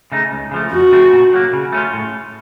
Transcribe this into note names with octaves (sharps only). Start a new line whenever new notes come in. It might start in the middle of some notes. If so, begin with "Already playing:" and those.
C#3 A3 D#4
C#2
C#3 F3 A3
F2 F#4
C#3 A3 C4
A#2
F#3 A#3
C#3
A3 C#4 F4
A2